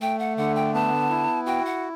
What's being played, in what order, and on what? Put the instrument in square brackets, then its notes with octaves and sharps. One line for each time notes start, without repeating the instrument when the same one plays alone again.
[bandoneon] A3 [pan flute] G5
[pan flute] F#5
[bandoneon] D3 [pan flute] F#5
[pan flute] G5
[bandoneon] B3 [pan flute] A5
[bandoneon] E4
[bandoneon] F#4 [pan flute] G5
[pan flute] F#5